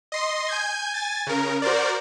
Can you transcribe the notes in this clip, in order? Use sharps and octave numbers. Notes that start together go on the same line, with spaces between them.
D#5 C6
G#5 G6 G#6
G#5 A6
C#3 A#4
F#4 A#4 C5 D5